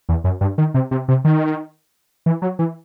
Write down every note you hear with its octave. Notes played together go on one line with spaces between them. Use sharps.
E2
F#2
G2
D#3
C3
C3
C3
D#3
E3
F#3
E3